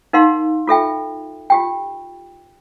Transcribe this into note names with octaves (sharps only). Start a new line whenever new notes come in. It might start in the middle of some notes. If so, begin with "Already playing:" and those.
D#4 A#4 F5 F#5 C6
F4 A4 E5 G5
F4 G4 G5